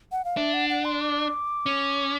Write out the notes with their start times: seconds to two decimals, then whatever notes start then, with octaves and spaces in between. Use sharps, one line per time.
0.12 F#5
0.25 F5
0.37 D4 E5
0.54 F#5
0.69 F#5
0.85 C6
1.01 D6
1.66 C#4